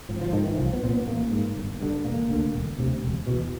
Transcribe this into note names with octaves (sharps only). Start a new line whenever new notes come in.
G#1 F3
F3
G#2 D#3
E3
C2 F3
B3
A#2 C4
B3
A1 A#3
G#2
G1
G2 D3
E1 A#3
D2 D3
E1
D2 C3
E1
E2 B2